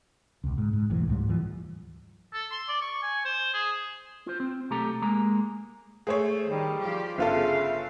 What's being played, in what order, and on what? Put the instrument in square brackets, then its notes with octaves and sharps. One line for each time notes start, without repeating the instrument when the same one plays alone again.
[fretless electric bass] E1 C#2
G#2
G#2
E1 B1 A2 E3
C#2 G#2 G3
D2 E3 F3
[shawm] A4
C6
D5
C#6
G#5
C5
G#4
[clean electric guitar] F4 C5
C4
B1 A3 G4 A4 A#5
G#3 A#3 A#5
[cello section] A3 [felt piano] G#4 C5 C#5
[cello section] D#3 [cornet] G3
[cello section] F3 G4
[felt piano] G1 F4 A4 [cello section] C#3 F5 [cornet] E5